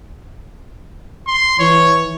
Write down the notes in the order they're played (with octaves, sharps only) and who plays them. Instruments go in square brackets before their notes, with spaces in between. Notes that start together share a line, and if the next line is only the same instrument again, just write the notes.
[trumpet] C6
[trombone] E3 [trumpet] C#5